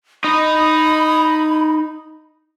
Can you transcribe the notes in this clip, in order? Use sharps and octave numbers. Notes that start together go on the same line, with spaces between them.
D#4 D#5 B5